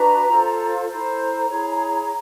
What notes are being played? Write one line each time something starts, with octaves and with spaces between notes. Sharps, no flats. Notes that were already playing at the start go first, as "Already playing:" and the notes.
Already playing: D4 F#4 B4 A#5
F4 A4 C5
E4 A4 C5 A#5
E4 G#4 C#5